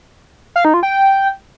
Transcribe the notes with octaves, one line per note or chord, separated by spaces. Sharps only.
F5
D#4
F4
G5